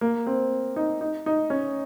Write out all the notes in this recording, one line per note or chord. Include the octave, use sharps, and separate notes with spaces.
A#3
C4
D#4
D#4
D#4
C#4